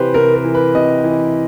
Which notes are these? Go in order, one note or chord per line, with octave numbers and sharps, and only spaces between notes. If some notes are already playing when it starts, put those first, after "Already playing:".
Already playing: C3 E3 G4 B4 C5
C3 A#4
A#4
E3
B4
C3 D#5
E3